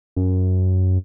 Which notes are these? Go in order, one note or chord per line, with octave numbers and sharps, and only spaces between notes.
F#2